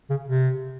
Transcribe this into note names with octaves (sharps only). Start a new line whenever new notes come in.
C#3
C3